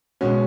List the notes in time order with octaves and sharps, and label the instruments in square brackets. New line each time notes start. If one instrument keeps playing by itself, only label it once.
[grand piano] B2 G#3 C#4 F#4